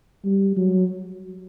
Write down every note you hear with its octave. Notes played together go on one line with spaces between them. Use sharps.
G3
F#3